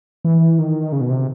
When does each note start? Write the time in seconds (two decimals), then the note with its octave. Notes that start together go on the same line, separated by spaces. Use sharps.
0.25 E3
0.59 D#3
0.92 C#3
1.01 B2
1.09 C3